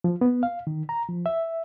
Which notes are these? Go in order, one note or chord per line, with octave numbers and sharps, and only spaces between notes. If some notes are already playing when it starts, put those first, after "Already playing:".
F3
B3
F5
D#3
A#5
F3
E5